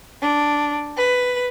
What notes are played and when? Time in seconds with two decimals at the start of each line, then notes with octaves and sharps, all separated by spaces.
0.21 D4
0.95 B4